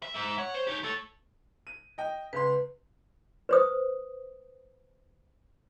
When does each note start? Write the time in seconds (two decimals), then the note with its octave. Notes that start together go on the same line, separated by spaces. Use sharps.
0.03 E5
0.14 G#2 E5
0.38 C#5 F#5
0.54 C5
0.67 D#4 G4
0.83 A3 A4 C#5
1.67 D#7
1.98 D#5 G5
2.33 C#2 B4 C6
3.49 B4 C5 D#6